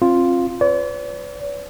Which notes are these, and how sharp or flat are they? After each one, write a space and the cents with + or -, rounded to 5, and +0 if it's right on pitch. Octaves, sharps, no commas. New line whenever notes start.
C4 +35 F4 +0
B4 +40 D5 -45